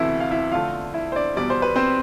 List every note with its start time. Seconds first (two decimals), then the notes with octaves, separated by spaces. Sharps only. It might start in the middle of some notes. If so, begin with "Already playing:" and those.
Already playing: D2 C3 E3 A3 E4 E5
0.20 F5
0.31 E4 E5
0.52 F2 D3 A3 F4 F5
0.94 E4 E5
1.12 C5
1.16 D4 D5
1.36 E2 B2 G3 D5
1.50 C5
1.62 B4
1.76 C4 C5